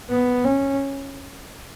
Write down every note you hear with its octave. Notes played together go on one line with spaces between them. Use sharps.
B3
C#4